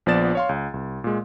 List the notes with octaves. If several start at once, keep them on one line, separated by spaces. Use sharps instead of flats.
A#1 F3 B3 D5 A6 E7
C#5 F5 C6
C#2
C2
A#2 G#3